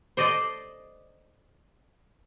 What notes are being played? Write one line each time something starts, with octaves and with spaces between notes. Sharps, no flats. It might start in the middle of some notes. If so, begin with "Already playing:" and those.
C5 D5 D#5